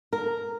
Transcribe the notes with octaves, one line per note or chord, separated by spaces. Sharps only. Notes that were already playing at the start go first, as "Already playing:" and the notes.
A#4